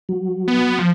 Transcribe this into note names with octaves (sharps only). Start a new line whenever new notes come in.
F#3
B3
F3